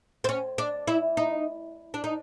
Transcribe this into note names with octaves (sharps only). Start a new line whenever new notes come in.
C4
C#4
D4
E4
D#4
D4
D#4